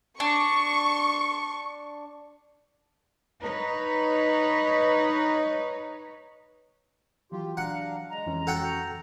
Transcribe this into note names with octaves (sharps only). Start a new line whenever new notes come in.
D4 C#6
D#4 B4 C#5
E3 F#3 F4 G4
D4 F5 F#5 A#5
G#3 A#5
F2 E3 C#4
F#4 A4 F#5 G5